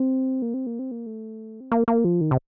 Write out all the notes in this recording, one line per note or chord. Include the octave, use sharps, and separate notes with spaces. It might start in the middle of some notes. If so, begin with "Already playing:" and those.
Already playing: C4
A#3
C4
A#3
C4
A#3
A3
C4
A#3
A#3
F3
D#3
C3